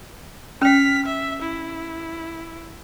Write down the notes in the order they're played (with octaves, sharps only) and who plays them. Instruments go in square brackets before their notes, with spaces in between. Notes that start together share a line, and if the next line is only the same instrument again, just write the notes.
[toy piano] C#4 G5 [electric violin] F6 B6
[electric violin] E5
E4